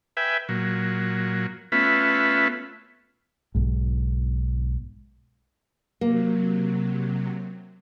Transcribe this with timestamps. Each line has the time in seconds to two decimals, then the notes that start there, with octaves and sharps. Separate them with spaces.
0.17 B4 E5 G5 G#5
0.49 A#2 F#3
1.72 A3 B3 C#4 F4 B4 E5
3.55 B1 G#2
6.01 C3 F#3 A#3